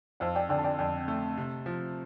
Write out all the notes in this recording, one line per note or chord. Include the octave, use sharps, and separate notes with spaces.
F2 C5 F5
D5 G5
D3 D5 G5
A5
D5 G5
F2 D5 G5
A3
C3
F3